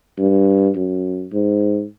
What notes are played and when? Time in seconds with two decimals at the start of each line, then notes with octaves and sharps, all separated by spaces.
0.18 G2
0.75 F#2
1.33 G#2